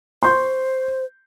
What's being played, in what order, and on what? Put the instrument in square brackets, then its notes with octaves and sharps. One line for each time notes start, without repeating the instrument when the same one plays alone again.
[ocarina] C5 [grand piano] C6 C#6 G6